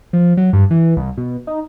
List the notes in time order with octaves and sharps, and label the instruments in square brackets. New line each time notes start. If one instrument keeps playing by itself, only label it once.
[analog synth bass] F3
F#3
G2
E3
C2
B2
D#4